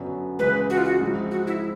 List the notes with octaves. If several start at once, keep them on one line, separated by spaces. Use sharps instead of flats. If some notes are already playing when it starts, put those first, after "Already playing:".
Already playing: F#2 D3 F#3 B3
C#2 C#3 E3 G#3 B4
F#4
F4
F#4
G#2 F3 G#3 C4 E4
F#4
E4